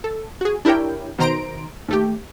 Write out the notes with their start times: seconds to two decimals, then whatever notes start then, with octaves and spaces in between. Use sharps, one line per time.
0.04 A4
0.41 F#4 G#4
0.65 D4 E4 G4 A#4 C#5 G5
1.18 B2 D#3 C5 A#5 C6 D7
1.88 D#2 A3 G4